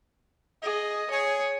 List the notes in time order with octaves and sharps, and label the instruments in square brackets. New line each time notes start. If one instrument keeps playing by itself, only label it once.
[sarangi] G#4 [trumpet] D#5
[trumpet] G#4 [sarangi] C#5